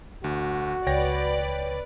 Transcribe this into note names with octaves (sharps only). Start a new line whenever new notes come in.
D2 F#4
C#2 B4 C#5 D5 G5 A#6